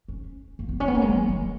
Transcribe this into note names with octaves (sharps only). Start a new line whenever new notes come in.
C#4
A#3
B3
C#4
B3
A#3
G#3
F#3
E3